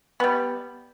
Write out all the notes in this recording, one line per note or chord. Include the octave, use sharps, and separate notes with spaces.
G3 B3